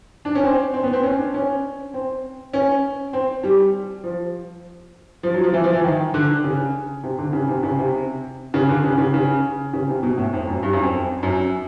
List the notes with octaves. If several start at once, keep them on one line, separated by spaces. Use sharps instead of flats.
D4
C#4
C4
C4
B3
C4
C#4
D4
C#4
C4
C#4
C4
G3
F3
F3
F#3
F3
E3
F3
E3
D#3
D3
C#3
C3
D3
C#3
C3
C#3
C3
C#3
D3
C#3
C#3
C#3
C#3
C3
B2
A2
F2
F#2
G2
F#2
F2
F#2